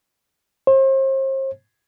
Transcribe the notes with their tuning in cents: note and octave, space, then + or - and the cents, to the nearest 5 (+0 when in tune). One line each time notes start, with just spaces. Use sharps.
C5 +40